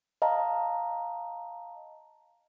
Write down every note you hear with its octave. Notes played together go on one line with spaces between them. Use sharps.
D#5 F5 A5 A#5